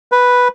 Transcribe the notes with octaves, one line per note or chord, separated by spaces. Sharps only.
B4